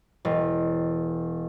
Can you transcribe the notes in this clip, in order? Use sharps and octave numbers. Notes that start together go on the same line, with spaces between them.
E1